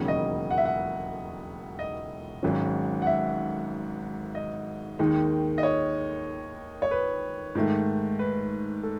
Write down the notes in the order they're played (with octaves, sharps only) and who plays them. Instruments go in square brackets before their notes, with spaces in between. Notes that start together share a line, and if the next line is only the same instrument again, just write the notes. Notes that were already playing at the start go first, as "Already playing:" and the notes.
Already playing: [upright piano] E1 D#2 C#3 F#3 C#4
D#5
F#5
E5
F#5
D#5
G#1 G#2 F#3 C#4
F#5
E5
D#5
D#2 D#3 G#3 D#4
D#5
C#5
C#5
B4
G#2 D#3 A3
B4
A4